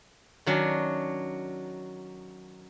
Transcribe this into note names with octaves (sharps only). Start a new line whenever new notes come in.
D#3 F#3 C#4 D4